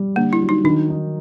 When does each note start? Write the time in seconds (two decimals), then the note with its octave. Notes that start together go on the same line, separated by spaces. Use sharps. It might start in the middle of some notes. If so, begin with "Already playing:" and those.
Already playing: G3
0.16 D3 A#3
0.33 E4
0.41 F#3
0.49 D#4
0.64 D#3 D4
0.89 D#4